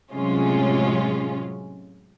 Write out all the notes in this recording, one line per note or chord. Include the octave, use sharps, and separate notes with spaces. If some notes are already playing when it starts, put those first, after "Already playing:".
A2 C3 F#3 G#3 C#4 F4